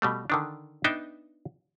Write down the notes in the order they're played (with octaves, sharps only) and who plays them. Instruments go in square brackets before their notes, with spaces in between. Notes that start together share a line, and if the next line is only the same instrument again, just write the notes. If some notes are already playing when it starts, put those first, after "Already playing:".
[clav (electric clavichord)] B2 G3 A3
D3 D#3 D4
B3 D4 D#4 E5 G5